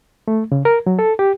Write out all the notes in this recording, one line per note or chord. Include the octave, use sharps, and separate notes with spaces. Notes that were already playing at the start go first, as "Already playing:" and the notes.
A3
C#3
A#4
F#3
A4
G4